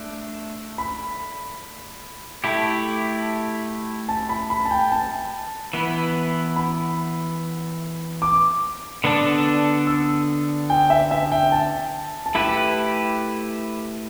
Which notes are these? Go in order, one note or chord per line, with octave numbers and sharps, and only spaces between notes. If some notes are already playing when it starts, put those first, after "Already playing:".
Already playing: A3 D4
B5
A3 E4 G4
A5
B5
B5
A5
G5
A5
E3 B3 E4
B5
D6
D3 B3 D4 A4 D5
E6
G5
E5
E5
G5
A5
A5
A3 E4 G4 B4 B5